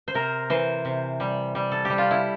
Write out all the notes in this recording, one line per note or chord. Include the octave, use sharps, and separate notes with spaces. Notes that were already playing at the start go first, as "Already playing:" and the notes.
C5
C3 A#4
E3 C5
C3
G3
G3
A4
G3 G4
F4
E4